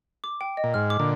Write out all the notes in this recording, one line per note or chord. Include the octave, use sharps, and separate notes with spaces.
D6
G5
D#5
A#2
G#2 F6
D6
A#2 D3